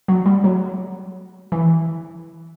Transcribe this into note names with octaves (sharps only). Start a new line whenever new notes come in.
F#3
G3
F#3
E3